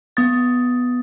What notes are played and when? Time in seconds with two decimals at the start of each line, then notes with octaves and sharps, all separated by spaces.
0.17 B3 D#6 A6